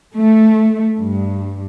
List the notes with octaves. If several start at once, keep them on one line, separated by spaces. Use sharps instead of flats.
A3
G2